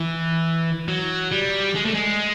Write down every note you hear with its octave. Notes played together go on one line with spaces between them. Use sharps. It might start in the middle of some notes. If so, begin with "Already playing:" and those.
Already playing: E3
F#3
G3
G#3
A3
G#3